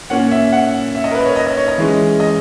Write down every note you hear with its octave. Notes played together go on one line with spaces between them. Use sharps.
A#2 A#3 C#4 F#5
E5
F#5
E5
D#5
A#4
B4
D#5
C#5
D#5
D#5
C#5
D#5
E3 G#3 C#4
D#5